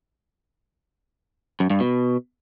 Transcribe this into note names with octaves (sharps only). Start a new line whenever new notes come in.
F#2
G2
B2